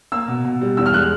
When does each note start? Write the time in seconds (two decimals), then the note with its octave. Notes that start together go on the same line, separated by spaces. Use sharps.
0.12 A#3 E6
0.28 B2
0.44 B2
0.61 G3
0.77 E2 E6
0.86 F6
0.94 G#3 F#6